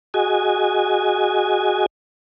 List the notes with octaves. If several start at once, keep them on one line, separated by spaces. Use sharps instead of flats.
F#4 G#4 D#5 G#5